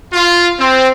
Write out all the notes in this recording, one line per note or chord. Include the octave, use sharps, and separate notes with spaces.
F4
C4